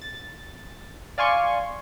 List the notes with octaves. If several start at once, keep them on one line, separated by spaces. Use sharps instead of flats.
A6
D5 F5 G#5 C6 C#6